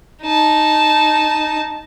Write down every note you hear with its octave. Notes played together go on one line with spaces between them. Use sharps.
D#4 A5